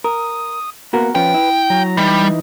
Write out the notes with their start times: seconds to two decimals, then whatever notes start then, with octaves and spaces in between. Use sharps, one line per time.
0.04 A#4 D#6
0.93 A#3 B3 F#4 A#4
1.15 F3 C#4 B4 G5
1.34 E4
1.70 F#3 A#5
1.97 E3 G3 D#4